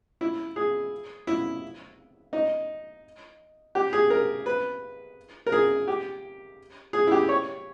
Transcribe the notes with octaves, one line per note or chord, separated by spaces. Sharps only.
E4
G#4
E4
D#4
G4
G#4
A#4
B4
A#4
G#4
G4
G#4
E4
G4
C#5